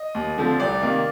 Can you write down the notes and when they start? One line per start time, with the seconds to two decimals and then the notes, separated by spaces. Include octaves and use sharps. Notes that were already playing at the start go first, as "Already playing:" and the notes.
Already playing: D#5
0.15 D#2
0.37 D3 F3 A3 C4
0.60 C2 D5
0.82 C3 D#3 A#3